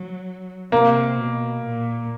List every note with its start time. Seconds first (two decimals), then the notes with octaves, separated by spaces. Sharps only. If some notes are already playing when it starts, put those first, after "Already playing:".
Already playing: F#3
0.72 C3 A#3
1.19 B2
1.65 A#2